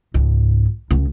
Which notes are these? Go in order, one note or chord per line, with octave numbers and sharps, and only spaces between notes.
C#2 G#2
C#2